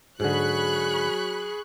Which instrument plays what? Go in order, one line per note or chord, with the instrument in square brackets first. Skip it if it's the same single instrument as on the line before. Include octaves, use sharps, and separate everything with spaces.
[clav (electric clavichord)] G#2 D3 [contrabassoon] F#3 [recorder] G#4 [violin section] B5 C#6 F#6